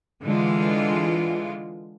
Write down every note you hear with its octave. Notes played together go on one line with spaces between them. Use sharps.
D3 E3 G#3 F4